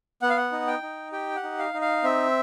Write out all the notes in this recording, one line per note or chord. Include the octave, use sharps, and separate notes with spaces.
B3 F#5
F5
F#5
D#4
G5
D#4
G4 G5
F#5
D#4
F5
D#4
F5
C4 E5